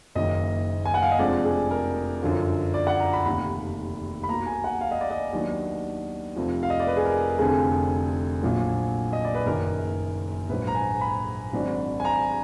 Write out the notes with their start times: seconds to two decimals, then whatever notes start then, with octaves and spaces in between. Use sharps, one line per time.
0.15 F#1 F#2 D#3 A#3 D#5
0.85 G#5
0.94 F#5
1.02 F5
1.11 D#5
1.19 F1 F2 F3 G#3 D4 D5
1.45 G#4
1.71 A#4
2.22 F#2 D3 F3
2.74 D5
2.87 F#5
3.00 A#5
3.13 B5
3.26 F1 D#2 D#3 B5
4.23 B5
4.29 B1 B2 A#3 A#5
4.46 G#5
4.64 F#5
4.81 F5
4.91 D#5
5.01 D5
5.11 D#5
5.33 D#2 D#3 F#3 B3 D4
6.36 F1 F2 F3
6.63 F5
6.70 D#5
6.80 D5
6.87 B4
6.97 G#4
7.05 A#4
7.39 F1 F2 D3 G#4
8.43 A#1 A#2 F#3
9.13 D#5
9.25 D5
9.35 B4
9.46 F#1 F#2 D#3 A#4
10.49 A#1 G#2 F#3 B4
10.67 A#5
10.75 G#5
11.01 B5
11.53 G#1 G#2 F#3 D4
12.00 G#5
12.05 A#5